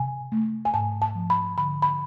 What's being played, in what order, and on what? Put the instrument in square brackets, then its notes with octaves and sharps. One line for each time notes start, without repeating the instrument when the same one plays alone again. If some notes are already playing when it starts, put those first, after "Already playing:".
Already playing: [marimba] C3 G#5
A3
G#5
G#2 A5
A5
F3
B5
D3 B5
B5